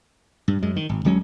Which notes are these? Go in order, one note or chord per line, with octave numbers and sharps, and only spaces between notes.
G2
F#2 G#3
D#3
G#1
D1 F#3 G#3 C#4